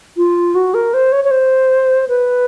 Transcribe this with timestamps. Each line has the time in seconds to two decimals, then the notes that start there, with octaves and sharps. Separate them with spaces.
0.17 F4
0.55 F#4
0.74 A#4
0.94 C5
1.12 C#5
1.24 C#5
1.31 C5
2.08 B4